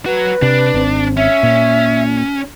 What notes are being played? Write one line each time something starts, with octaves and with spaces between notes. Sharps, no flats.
F#3 F#4 B4
C3 D4
G#1 C4
C#4 E5
A#2